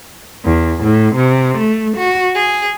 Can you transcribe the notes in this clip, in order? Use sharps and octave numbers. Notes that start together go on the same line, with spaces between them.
E2
A2
C3
A3
F#4
G#4